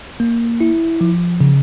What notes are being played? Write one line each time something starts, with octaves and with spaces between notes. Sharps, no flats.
A#3
E4
F3
C#3